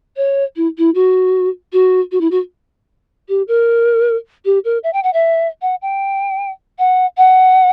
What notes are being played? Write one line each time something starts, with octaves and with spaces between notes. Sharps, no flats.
C#5
E4
E4
F#4
F#4
F#4
E4
F#4
G4
A#4
G4
A#4
E5
G5
F#5
E5
F#5
G5
F#5
F#5